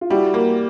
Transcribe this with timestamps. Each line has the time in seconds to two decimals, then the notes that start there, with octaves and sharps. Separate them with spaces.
0.01 F4
0.10 G3 E4 F#4
0.34 A#3